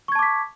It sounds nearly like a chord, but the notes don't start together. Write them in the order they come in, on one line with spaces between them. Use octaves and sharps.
C#6 G#6 A5 D6 B6